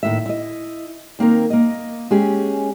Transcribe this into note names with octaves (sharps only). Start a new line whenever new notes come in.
D#2 A2 E5
E4 D#5
D#3 A#3 C4 A#4
A#3 D#5
G#3 C#4 G4 G#4